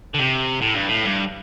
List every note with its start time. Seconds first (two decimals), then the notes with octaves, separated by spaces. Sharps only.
0.14 D3
0.19 C3
0.62 A2
0.75 G2
0.89 A2
1.05 G2